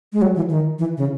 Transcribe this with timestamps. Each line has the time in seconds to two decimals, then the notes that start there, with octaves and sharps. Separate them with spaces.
0.13 G#3
0.22 F#3
0.36 E3
0.50 D#3
0.79 E3
0.97 C#3